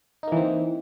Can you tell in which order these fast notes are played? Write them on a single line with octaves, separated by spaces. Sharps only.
D#4 A#3 E3 C4